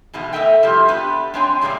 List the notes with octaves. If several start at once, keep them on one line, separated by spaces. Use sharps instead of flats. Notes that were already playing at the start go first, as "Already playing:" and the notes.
B2 D#3 E3 G#3 B3
A3 A4 A#4 D#5 E5 G5
C3 F3 G3 E4 G4
B3 D4 G4 B4
G#3 C4 D4 C#5 G5 G#5
G2 C3 E3 G#3 A#3 D5